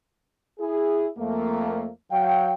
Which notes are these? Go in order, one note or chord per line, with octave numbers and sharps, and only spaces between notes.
E4 G#4
F2 A3 A#3
F#3 F5 G5